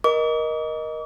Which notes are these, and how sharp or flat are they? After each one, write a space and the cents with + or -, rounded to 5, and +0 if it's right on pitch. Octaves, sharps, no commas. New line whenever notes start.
A#4 +20 D#5 +0 D6 -45